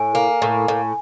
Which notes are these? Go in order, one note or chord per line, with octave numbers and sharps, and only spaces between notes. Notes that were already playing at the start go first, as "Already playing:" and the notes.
Already playing: A2 G#5
A#3
A2
A2